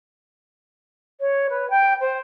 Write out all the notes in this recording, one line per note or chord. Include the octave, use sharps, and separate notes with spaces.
C#5
B4
G5
C5